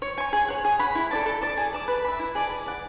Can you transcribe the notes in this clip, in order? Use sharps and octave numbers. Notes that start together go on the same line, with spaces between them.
C#5
G#5 C#6
G#4
C#5 F#5
G#4
C#5 F#5 B5
E4
A4 D5 A5
A4
D5 A5
G#4
D5 A5 D6
B4
E5 B5
E4
G#4 D5 A5
B4
D5 F#5